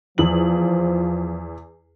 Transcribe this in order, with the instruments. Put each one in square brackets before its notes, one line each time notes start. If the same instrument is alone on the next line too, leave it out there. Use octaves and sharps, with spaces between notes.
[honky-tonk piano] E2 F#7 [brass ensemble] F3